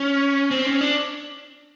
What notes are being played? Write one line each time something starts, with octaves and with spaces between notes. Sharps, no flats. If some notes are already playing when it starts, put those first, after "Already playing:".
Already playing: C#4
C4
C#4
D4